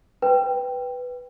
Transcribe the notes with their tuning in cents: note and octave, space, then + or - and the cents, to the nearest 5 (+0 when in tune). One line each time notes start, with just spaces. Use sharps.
B4 +0 G5 +0